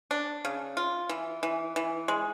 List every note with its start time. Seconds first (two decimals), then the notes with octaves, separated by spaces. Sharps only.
0.11 D4
0.45 C#3
0.77 F4
1.09 E3
1.43 E3
1.76 E3
2.08 G#3